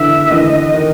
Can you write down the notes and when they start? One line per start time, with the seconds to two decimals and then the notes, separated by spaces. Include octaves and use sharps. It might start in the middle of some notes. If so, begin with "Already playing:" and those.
Already playing: D3 E3 E5
0.25 D#3
0.30 D3 E3 D#5
0.73 D#3